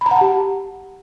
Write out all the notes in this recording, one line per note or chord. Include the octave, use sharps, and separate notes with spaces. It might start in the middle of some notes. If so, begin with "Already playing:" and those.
B5
A#5
F#5
A5
G4